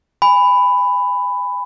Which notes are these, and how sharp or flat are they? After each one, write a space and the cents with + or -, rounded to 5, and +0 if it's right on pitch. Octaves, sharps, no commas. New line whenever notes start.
G#5 -25 B5 +10